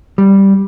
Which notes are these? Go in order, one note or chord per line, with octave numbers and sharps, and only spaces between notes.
G3